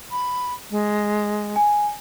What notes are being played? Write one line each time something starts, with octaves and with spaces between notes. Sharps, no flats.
B5
G#3
G#5